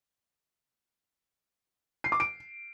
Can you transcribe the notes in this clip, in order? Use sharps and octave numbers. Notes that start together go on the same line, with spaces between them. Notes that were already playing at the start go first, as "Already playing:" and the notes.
C7
D6
D7